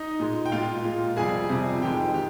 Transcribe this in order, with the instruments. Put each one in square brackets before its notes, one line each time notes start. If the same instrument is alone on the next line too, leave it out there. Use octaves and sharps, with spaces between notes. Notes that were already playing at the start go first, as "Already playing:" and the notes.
Already playing: [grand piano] D#4 D#5
A#2 G#3
G5
A#2 G#3 F4 F5
A#2 G#3
F2 C3 G3 G#4 G#5
F2 C3 G3
F2 D#3 G#3 G4 G5
D#3 G4